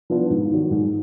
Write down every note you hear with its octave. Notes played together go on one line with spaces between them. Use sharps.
F3 B3 D4 F4
G#2
D#3 F#3
G#2